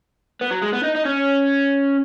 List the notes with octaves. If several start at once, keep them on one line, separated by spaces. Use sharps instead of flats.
B3
F#3
G#3
B3
D#4
D#4
C#4